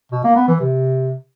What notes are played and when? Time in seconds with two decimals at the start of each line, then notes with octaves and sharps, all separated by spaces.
0.12 B2
0.24 A#3
0.36 B3
0.48 E3
0.60 C3